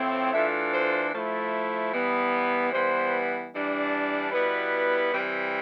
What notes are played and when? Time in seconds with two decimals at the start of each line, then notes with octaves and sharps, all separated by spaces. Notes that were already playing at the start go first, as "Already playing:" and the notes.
Already playing: A2 F3 C4 E4
0.33 E3 A3 D4 F4 E5
0.73 C5
1.13 F3 A3 E4
1.93 E3 G3 B3
2.72 E3 G3 B3 C5
3.52 E3 G3 D4
4.32 B2 G3 B3 E4 B4
5.12 E3 G3 C4